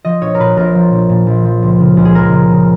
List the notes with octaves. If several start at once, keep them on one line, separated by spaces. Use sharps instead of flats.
F3 D#5
A#1 C#5
A#4
A#2 B4
A#1 A#4
F3
A#1
A#2
A#1
F3
C#2
C#3
C#2
G#4
F3 A#4
C#2
C#3